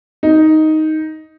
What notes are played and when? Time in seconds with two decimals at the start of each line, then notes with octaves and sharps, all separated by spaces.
0.23 D#4